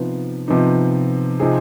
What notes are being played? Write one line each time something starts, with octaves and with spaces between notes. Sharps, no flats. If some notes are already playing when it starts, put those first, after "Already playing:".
Already playing: C3 F3 B3 D#4
C3 F3 B3 D#4
C3 F3 C4 D#4 G#4